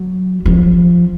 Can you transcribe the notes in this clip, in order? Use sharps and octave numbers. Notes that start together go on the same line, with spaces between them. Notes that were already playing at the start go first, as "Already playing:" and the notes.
Already playing: F#3
F3